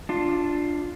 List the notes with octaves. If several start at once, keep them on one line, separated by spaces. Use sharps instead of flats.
D4 F4